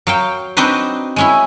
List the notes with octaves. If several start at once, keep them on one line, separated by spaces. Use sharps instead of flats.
F#3 F5 G5
C4 D4 D#4 F#4 B4 C5
G#3 C#4 E4